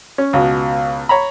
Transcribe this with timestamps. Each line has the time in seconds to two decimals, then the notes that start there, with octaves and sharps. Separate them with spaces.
0.18 C#4
0.33 C#2 B2
1.09 C#5 A#5 B5